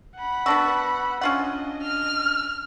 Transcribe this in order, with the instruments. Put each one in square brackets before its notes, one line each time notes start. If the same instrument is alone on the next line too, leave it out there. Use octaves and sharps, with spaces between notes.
[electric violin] F#5 B5
[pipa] B3 D4 F#4 [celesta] E6 A#6
[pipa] C#4 F4 F#5 [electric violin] D4 D#5
[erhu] F6